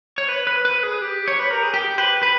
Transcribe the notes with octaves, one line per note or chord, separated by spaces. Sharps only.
C#5
B4
B4
B4
G#4
G4
C#5
B4
A#4
G#4
G4
B4
B4